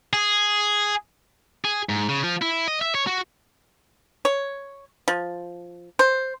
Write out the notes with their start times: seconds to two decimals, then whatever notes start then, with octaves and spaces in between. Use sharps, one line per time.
0.13 G#4
1.65 G#4
1.89 G#2
2.09 C#3
2.24 F3
2.42 E4
2.68 D#5
2.81 E5
2.95 C#5
3.07 F#4
4.25 C#5
5.08 F3
5.99 C5